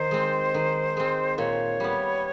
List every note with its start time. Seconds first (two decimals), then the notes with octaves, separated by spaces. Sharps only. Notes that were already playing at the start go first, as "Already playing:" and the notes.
Already playing: D#3 C5
0.11 G#3 C4
0.54 D#3
0.97 G#3 C4
1.38 A#2 C#5
1.80 G3 B3